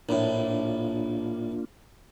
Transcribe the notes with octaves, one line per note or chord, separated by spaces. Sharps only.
A#1 A2 A#3 D4 F4